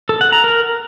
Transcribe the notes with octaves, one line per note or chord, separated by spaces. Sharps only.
A4
F#5
A#5
A#4